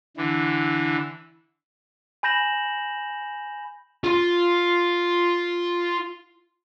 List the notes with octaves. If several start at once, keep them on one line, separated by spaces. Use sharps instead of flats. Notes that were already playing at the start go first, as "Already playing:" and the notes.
D3 E3
G#5 B5 G6 A#6 E7 F#7
F4 C6